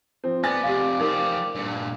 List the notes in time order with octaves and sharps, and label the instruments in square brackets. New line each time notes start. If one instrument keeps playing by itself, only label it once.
[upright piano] F3 C4
[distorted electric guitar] B3 [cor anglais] D5 [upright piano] G#5 A6
[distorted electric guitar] F2 C3 [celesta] G4 F5
[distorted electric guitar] F3 G4 [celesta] D#4 A#4 F5
[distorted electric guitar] G2 A#2